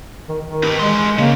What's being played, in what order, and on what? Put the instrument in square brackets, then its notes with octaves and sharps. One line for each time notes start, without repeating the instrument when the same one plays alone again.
[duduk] D#3
D#3
[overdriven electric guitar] G4 B4
[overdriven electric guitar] E3 C6 [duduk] G#3
[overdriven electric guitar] C#3 [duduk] A#3